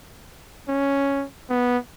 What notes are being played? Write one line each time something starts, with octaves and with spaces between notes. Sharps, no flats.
C#4
B3